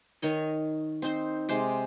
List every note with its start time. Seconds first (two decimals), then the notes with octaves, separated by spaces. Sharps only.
0.22 D#3 C#5 D#5
1.02 C4 D#4 C5
1.49 C3 G#3 C5 D6